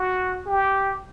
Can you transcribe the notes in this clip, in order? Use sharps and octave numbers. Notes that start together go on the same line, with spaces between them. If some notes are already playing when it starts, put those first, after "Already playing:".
Already playing: F#4
G4